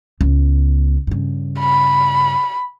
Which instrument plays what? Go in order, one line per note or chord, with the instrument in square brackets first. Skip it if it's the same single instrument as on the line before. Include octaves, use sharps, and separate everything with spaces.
[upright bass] C#2 B3
G2 C#3
[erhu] B5